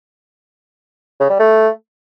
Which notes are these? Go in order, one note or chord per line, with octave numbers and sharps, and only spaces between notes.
C#3
G3
A3